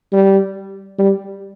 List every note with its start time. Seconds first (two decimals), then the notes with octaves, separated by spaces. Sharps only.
0.12 G3
0.99 G3